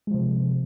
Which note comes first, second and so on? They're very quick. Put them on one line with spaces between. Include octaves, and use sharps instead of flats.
G#3 F3 C3